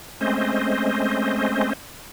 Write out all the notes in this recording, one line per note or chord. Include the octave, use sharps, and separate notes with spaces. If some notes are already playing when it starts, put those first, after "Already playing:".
G#3 A3 C4 C#4 C5 D#5